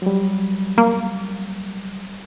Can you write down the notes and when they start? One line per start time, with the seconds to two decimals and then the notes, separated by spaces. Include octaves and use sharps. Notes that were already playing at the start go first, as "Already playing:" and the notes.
0.02 F#3 G3
0.78 A#3